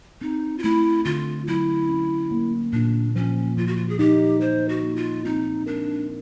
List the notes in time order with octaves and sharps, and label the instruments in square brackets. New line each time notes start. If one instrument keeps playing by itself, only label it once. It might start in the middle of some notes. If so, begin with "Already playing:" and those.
[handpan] C4 [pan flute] D#4
[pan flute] F4
[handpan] A3 [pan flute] E4
[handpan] D3 [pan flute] F4
[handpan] F#3 [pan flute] E4
[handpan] C#4
A#3
[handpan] A#2 [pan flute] D4
[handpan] F3 [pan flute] C#4
[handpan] F3 [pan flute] F4
[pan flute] F#4
F4
G#4
[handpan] D#4 [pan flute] G4
[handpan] F3 [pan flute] C5
[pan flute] F#4
[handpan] A#3
[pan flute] F4
[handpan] C4 [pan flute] D#4
[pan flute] D4 [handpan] A#4